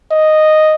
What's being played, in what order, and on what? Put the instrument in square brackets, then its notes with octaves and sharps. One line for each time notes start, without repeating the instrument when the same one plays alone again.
[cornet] D#5